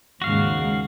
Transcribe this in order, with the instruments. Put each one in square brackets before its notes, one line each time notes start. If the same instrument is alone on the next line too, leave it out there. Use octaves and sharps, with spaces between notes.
[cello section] D#2 G#2 C#3 [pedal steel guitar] F#4 F5